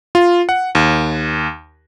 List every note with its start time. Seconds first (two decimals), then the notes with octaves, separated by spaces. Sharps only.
0.15 F4
0.49 F#5
0.75 D#2